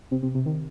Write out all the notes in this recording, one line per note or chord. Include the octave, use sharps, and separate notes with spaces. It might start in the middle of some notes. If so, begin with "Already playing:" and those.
C3
C3
C3
D#3